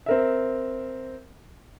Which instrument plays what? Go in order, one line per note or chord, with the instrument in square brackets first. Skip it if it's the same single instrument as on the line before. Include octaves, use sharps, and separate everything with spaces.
[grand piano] C4 A#4 E5